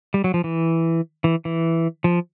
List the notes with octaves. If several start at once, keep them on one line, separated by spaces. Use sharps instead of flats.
G3
F#3
F3
E3
E3
E3
F3